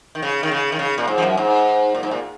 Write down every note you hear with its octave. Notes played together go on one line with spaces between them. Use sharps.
D#3
C#3
D#3
C#3
D#3
C#3
A#2
G#2
F3
F#2
G#2
A#2
G#2
A#2